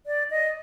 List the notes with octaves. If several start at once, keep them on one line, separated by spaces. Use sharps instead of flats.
D5
D#5